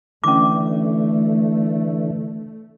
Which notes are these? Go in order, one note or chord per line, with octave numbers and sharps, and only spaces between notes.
D3 E3 A3 C#4 D6